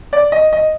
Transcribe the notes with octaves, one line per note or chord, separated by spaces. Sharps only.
D5
D#5
D#5